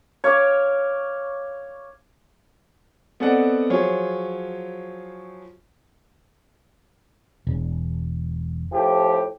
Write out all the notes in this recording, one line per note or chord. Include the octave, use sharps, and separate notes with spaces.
C#5 F5 D6
B3 C4 A4 D5 D#5 F#5
F3 F#3 F4 G#4 C5 C#5
E1
A2 F3 G4